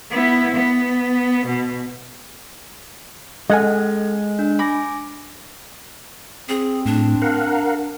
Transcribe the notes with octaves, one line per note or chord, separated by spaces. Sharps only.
B3 E4
B3
B2
G#3 C#4 A4 D#5 F#5 G#5 F6
D4
G#5 B5 D6 A#6
C4 G#4
A2 D4
A#4 F5 F#5